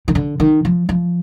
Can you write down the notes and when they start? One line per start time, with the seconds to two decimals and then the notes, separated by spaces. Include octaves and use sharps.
0.08 D#3
0.15 D3
0.40 D#3
0.65 F3
0.89 F3